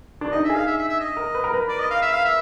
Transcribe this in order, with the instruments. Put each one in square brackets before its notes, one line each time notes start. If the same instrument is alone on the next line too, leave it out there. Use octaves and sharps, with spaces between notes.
[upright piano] D4
[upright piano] D#4 [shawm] D#5
[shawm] E5
[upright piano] G#4
[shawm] F5
E5
E5
E5
D#5
[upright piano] A#4
B4
A#4
B4
[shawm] D5
D#5
F5
E5
F5
E5